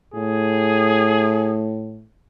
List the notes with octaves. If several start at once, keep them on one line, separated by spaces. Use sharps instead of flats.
A2 G#4